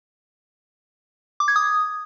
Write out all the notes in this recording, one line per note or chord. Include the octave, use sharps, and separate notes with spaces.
D6
G#6
D#6